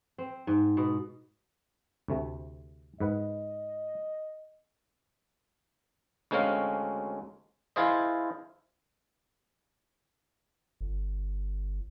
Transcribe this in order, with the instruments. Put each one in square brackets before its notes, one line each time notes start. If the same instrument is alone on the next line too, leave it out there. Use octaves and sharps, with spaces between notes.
[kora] C4
G#2
B2
[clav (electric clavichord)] D2 C3 A3
[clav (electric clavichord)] G#2 B4 F#5 [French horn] D#5
[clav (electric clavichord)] D2 G#3 C4 C#4 F5
E4 F4 G#4 C5 D#5
[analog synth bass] G1